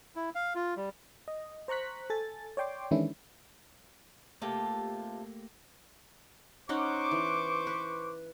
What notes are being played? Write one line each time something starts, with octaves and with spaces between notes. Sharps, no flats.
E4
F5
F4
G3
D#5
C5 A#5 C#6 F#6 B6
A4 G#5 A6
C#5 D5 G5 C6 D6
D#3 E3 G#3 C#4 D4 E4
C3 A3 A#3 F4 G4 A5
C#4 D#4 C5 F#5 C#6 D6
E3
B4